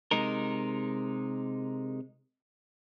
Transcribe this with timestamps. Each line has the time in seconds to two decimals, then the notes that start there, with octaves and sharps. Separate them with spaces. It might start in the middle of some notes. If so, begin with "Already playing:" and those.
0.11 C3 G#3 D#4 A#4